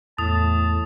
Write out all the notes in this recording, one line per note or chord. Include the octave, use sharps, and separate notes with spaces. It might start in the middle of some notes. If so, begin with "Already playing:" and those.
E2 A2 A5 D#6